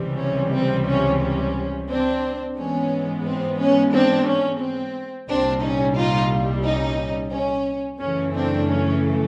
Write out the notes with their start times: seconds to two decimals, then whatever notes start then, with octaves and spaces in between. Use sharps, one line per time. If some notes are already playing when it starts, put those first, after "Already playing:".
Already playing: C#2 C3 E3 G3
0.19 C#4
0.54 C4
0.88 C#4
1.22 C#4
1.89 C4 D4
2.57 G#2 E3 G#3 B3 C#4
3.26 C4
3.58 C#4
3.93 C4 D4
4.27 C#4
4.60 C4
5.28 C2 A#2 G3 C4 D4
5.62 C#4 D#4
5.96 D#4 F4
6.64 C#4 D#4
7.32 C#4
7.99 F#2 C#3 E3 A3 C#4
8.34 C4 D4
8.68 C#4